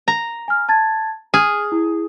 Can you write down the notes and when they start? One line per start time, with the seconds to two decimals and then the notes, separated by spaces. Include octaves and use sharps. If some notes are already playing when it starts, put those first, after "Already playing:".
0.08 A#5
0.48 G#5 F6
0.69 A5 G#6 A6
1.34 G#4 F6
1.72 E4